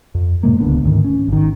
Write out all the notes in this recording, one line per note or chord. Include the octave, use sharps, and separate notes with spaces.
F2
A2 C3 G#3 A#3
D1 C#2 D3 B3
D2 G#2 D#3
C#4
G#1 D#3